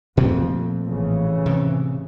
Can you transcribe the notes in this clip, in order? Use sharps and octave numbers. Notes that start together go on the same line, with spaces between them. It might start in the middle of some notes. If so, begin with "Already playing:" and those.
F2 A#2 A3 C4
A1 C#3 E3
C3